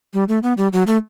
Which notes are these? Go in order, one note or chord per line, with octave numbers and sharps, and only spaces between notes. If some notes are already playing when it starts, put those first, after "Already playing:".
G3
A3
B3
G3
F#3
A3